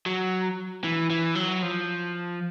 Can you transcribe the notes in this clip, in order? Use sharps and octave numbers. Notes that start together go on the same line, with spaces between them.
F#3
E3
E3
F#3
F3